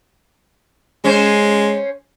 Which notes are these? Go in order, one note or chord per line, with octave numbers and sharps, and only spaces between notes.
G#3 C#4 C5